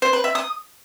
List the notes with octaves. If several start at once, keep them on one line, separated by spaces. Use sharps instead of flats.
C5
B4
E5
D#6